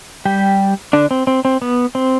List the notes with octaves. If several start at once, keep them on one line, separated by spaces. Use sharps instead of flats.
G3 G4
D3 D4
C4
C4
C4
B3
C4